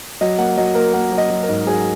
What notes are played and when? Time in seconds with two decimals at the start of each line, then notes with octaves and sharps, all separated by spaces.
0.21 F#3 D#5
0.38 A#3 F#5
0.57 F#3 D#5
0.75 A#3 A#4
0.94 A#3 F#5
1.12 F#3
1.18 D#5
1.30 F#3
1.43 A#4
1.49 G#2
1.67 F#3 G#4